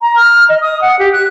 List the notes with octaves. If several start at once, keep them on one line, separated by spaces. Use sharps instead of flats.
A#5
F6
D#5
D#6
F#5
G4
F#6